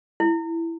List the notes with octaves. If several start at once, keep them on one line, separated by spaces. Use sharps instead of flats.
E4